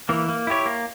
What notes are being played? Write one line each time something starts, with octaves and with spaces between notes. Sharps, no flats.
E3 A#3
A#3
E4 G4 C#5
A#3